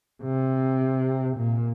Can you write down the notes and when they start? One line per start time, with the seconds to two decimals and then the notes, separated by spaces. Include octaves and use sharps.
0.23 C3
1.37 A#2